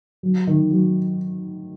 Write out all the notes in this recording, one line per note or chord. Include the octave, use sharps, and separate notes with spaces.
F#3
D#3
F#3